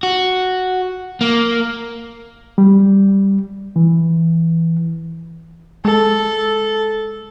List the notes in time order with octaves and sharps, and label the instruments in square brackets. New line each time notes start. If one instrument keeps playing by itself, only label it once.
[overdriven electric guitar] F#4
A#3
[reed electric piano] G3
E3
[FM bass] G#3 [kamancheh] A4